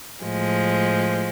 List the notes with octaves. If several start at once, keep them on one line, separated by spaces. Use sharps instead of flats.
A2 F3 G#3